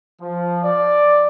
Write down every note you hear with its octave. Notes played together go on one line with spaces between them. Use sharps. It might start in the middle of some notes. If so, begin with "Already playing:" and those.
F3
D5